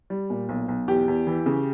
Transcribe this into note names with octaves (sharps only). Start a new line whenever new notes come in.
G3
A#2
B1
B1
E2 G4
E2
E3
C#3